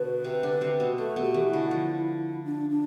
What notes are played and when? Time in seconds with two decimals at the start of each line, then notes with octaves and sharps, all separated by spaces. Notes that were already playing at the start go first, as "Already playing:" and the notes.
Already playing: B2 D3 B4
0.24 C3 C4
0.43 D3 D4
0.61 C3 C4
0.80 B2 B3
0.98 A3 A4
1.16 B2 B3
1.22 G4
1.34 E3
1.47 E4
1.53 D3
1.71 F3
2.45 D4
2.70 D4